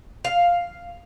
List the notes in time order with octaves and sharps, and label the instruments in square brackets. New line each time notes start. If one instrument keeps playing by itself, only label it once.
[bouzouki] F5